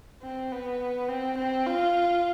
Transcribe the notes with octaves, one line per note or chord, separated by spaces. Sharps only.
C4
B3
C4
C4
F4